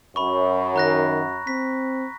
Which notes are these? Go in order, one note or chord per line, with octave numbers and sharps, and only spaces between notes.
F#2 B5 C#6
D#3 A#5 F#6 A#6
C4 B6